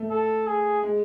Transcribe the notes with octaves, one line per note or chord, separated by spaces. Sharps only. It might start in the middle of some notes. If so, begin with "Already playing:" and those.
Already playing: A3
A4
G#4
G#3